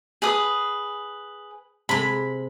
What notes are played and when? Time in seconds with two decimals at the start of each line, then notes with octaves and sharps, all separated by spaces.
0.22 G#4 B4 D#6
1.89 C3 G#3 B5